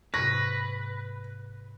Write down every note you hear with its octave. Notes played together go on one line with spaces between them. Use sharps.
G#2 C3 B4 C#6 A#6